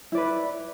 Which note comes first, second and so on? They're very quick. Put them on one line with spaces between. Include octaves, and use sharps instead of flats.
E4 D5 B4